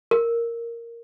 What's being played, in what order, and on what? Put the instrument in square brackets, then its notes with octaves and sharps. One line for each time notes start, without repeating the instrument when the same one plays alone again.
[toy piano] A#4